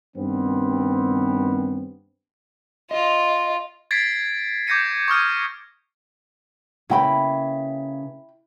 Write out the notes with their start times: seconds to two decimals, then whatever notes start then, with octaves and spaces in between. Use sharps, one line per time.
0.16 G2 D#3 B3 C4
2.91 F4 D#5
3.91 G#6 A6 B6 C7 D7
4.67 D6 G6 G#6 A#6 C#7 D#7
5.08 C#6 D#6 F6 G#6
6.90 C#3 A#3 E4 B4 G5 B5